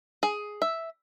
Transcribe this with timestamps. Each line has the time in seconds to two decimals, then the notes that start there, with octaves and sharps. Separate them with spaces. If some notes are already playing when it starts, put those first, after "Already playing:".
0.23 G#4
0.62 E5